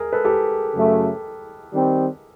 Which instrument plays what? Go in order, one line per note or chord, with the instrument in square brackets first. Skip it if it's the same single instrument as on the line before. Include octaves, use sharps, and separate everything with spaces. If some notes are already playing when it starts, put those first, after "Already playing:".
Already playing: [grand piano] G#4 A#4
A4 B4
G4 A4
[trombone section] F#2 C#3 F#3 A3
D#3 G3 C4